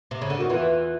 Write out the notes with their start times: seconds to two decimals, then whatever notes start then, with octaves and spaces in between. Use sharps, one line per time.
0.11 C3
0.21 C#3
0.30 D3
0.39 D#3 F#4
0.49 E2 E3 F4